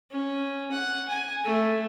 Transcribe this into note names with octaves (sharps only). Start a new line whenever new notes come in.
C#4
F#5
G#5
A3